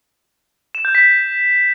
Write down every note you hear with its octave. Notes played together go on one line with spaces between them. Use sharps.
E7
G6
B6